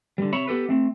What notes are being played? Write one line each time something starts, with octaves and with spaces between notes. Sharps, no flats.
D3 G3
C3 C#5 E5 B5
B3 G4 A4 B4
A3 C4